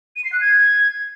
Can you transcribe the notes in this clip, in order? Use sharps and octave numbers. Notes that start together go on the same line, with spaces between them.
D#7
C7
F#6
G#6